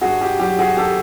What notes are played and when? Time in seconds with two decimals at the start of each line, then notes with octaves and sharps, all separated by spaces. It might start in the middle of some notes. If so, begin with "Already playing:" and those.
0.01 G2 F#4 G#4
0.21 G4
0.40 F#3 G4
0.59 F#4 G#4
0.77 D#3 G4 A4